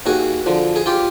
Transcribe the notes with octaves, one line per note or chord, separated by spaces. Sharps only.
D#2 F#4 G#4
D3 F3
G#4
F4 G4